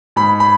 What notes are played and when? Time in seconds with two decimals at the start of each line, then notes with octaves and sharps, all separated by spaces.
0.16 G#2 B5
0.40 B5